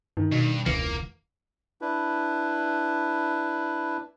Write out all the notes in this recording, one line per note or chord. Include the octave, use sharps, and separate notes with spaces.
G2 D#3
G2 B2
E1 C#2 E3 A#3 C#7
D4 E4 B4